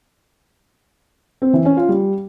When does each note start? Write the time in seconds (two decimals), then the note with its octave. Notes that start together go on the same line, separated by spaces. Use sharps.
1.42 C4
1.53 E3
1.65 C#4
1.77 F4
1.89 G3